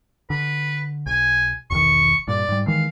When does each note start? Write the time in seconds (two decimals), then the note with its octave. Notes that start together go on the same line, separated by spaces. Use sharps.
0.30 D3 B4
1.06 B1 G#5
1.70 E1 B1 D#3 C#6
2.28 G2 A#2 D5
2.49 G#2 G3
2.67 D#3 E3 G#3 F5